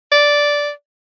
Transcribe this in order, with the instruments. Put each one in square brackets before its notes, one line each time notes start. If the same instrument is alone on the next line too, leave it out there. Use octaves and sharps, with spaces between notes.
[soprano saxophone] D5